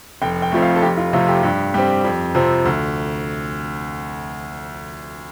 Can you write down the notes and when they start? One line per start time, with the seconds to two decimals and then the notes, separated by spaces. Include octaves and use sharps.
0.22 F1 G5
0.42 G5
0.52 F2 F3 A3
0.62 F5
0.76 A4
0.82 F1 G4
0.97 F4
1.13 F2 C3 A3 C4 F4
1.28 G4
1.43 G2 G4
1.74 G3 C4 G4
2.04 F2
2.35 C3 F3 C4
2.65 D2